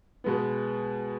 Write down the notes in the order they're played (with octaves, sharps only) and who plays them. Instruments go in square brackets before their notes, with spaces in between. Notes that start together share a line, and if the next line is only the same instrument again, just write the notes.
[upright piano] B2 G#3 B3